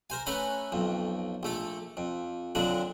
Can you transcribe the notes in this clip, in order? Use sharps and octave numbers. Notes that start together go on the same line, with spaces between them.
A#4 C5 G#5
A3 C#4 B4 G#5 A#5 C6
B1 F2
A#1 A3 A4
F2
F2 A#2 D3 F#3 D4